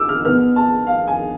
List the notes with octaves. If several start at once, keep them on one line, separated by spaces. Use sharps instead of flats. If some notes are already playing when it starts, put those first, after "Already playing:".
Already playing: D6 E6
F6
B2 B3 F6
A5
F5
G#5